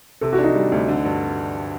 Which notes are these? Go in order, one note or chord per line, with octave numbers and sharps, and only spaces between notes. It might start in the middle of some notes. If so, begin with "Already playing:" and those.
C3 A4
F#4
D4
D#4
G3
D2
D3
G2